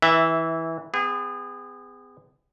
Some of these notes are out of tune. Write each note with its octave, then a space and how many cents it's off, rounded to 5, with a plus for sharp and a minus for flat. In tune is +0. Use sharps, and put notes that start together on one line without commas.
E3 -15 E5 +0
B3 +40 G#4 -30